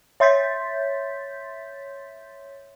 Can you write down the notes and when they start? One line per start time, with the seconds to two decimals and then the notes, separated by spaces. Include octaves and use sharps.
0.20 C#5 E5 C6 G6 A6 B6